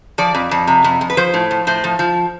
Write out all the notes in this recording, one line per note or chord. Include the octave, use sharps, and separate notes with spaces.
F3 D5
F2
F2
C3
F2
F2
B4
F3 C5
A2
F3
A2 C5
F3
F3